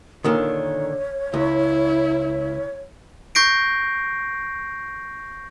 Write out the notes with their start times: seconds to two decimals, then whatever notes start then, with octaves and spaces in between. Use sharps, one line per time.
0.24 A#2 D3 D#3 C#5
1.34 C#2 E4
3.35 C#6 G6 A#6 C7 D7